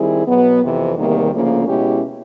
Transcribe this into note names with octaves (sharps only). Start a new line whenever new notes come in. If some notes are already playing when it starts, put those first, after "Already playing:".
Already playing: D#3 G3 C4 E4 G#4
B2 F#3 B3
F2 C3 E3
E2 C3 D#3 G3 A#3
D2 C#3 F3 A#3
B2 G#3 C#4 E4 G4